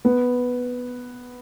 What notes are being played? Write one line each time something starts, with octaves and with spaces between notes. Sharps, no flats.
B3